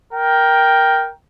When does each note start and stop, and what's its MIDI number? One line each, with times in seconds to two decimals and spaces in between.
0.13 1.07 70
0.13 1.07 79